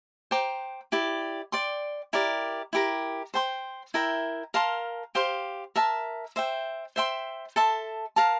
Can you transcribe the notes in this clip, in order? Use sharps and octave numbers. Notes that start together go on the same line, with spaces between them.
C5 G5 A#5 D6
E4 G4 D5
D5 G5 C6
E4 G4 A#4 D5
E4 G4 A#4
C5 G5 C6
E4 A#4 E5 G5
A#4 F5 A5 C6
G4 C5 F5 C6
A#4 E5 A5
C5 E5 G5
C5 E5 G5 C6
A4 E5 A5 C6
A#4 F5 A5